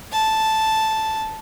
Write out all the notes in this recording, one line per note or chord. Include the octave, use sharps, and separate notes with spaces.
A5